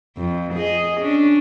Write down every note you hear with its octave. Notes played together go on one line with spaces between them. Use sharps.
F2
G#4 D#5
C#4 D4